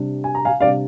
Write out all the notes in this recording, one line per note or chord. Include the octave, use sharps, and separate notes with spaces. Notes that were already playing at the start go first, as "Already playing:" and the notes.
Already playing: C3 G3 D4
G#5
A#5
F5 G#5
C3 G3 D4 D5 F5